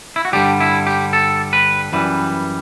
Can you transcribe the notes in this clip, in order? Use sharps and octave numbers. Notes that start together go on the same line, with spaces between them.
E4
F#4
G2 D3 G3 G4
E4
G4
A4
B4
F#2 E3 G3 B4